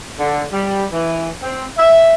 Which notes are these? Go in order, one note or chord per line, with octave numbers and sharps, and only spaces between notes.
D3
G3
E3
C4
E5